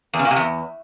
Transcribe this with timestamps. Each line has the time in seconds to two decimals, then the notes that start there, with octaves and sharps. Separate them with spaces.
0.13 E2
0.19 C#3
0.25 A#2
0.31 C3
0.36 E2